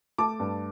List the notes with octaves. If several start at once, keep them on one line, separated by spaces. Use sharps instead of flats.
A3 A5 D6
G2